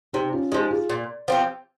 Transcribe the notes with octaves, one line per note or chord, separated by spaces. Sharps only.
C3 D#4 G4
C#4 F4
F3 G#3 D#4 G4
F4 G#4
A#2
F3 C4 G4